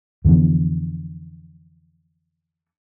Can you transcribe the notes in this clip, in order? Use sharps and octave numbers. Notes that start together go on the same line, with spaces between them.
F2 D3 E3 B3